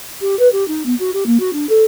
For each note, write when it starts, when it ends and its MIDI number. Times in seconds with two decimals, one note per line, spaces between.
0.21 0.37 67
0.39 0.48 71
0.52 0.66 67
0.68 0.85 63
0.85 0.94 59
0.99 1.10 66
1.13 1.24 67
1.26 1.37 58
1.40 1.50 66
1.53 1.66 62
1.69 1.85 69